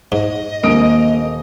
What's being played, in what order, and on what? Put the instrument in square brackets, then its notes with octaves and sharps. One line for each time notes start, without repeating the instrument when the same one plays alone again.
[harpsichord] G#2 [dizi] D#5
[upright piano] D#1 D#6 D7 [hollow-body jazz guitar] A#3